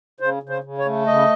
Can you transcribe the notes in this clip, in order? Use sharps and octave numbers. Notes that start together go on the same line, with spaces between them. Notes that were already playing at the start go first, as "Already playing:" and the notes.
C#3 C5
C#3
C5
C#3
C#5
A3
C#3 D#5